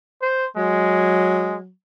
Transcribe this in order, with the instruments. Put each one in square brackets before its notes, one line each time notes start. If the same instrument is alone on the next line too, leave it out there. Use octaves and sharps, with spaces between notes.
[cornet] C5
[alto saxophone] F#3 [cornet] G#3